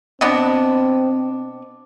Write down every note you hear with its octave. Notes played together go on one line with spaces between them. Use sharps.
B2 B3 C4 D4